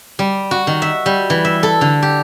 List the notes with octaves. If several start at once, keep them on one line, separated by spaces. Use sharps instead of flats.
G3
F#4
D#3
E5
G3
E3
E5
A4
D3
G4